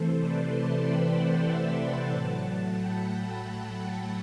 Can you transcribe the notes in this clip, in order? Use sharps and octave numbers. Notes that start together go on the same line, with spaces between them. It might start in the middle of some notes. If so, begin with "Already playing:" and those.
Already playing: C3 E3 A3 A4 C5
B4 D5
A5 C6
G5 B5
F#5 A5
E5 G5
A2 F#3 A3 F#5 A5
G5 B5
G5 B5